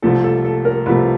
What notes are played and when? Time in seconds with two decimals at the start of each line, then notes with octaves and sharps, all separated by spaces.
0.02 C2 C3 F3 A3 A4
0.24 A4
0.44 A4
0.65 A#4
0.86 C2 C3 F3 A3 B4